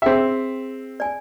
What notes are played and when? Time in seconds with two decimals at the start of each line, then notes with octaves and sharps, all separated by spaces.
0.02 C4 G#4 E5 G5
1.00 D5 G#5